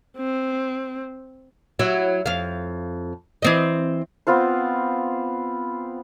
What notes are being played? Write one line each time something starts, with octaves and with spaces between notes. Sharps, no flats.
C4
F#3 E4
F2 F5
E3 C4 D#5
B3 C4 F4 C5